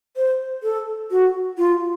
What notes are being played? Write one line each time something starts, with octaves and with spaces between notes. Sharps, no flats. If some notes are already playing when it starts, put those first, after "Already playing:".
C5
A4
F#4
F4